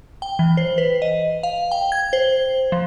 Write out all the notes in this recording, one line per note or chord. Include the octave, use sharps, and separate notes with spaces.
G5
E3
C5
B4
D#5
F5
G5
G#6
C5
F3